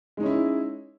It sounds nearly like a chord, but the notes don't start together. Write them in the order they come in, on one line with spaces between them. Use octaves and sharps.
G#3 D#4 C#4 E4